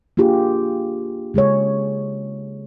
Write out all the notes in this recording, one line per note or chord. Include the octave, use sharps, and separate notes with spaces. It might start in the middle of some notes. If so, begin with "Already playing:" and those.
A#3 D4 F4 G4 G#4
C#3 G#3 G#4 C#5